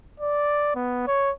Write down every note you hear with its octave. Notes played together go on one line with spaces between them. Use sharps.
D5
B3
C#5